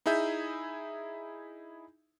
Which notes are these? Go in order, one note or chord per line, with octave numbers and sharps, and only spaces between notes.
D#4 E4 G#4 E5 G6